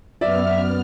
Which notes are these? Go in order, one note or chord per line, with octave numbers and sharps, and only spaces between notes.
F#2 B3 D5 E5 F6